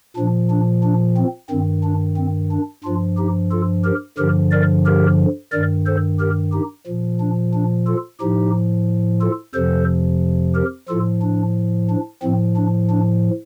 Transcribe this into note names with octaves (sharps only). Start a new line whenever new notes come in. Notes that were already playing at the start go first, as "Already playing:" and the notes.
A#2 F3 D4
D4
D4
C4
G2 D#3 C4
D4
C4
D4
G2 F3 D4 F4
D#4 G4
F4 A4
G4 A#4
G2 D3 F3 G4 A#4
A#4 D5
G4 A#4
G2 D#3 A#4 D5
A4 C5
G4 A#4
D#4 G4
A#2 F3
D4
D4
F4 A4
A2 F3 D#4 G4
F4 A4
F2 C3 F3 A4 C5
G4 A#4
A2 F3 F4 A4
D4
D4
A2 F3 C4
D4
D4